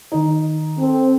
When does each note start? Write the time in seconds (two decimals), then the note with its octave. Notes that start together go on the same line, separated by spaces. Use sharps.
0.12 D#3 D#4
0.78 C4 A4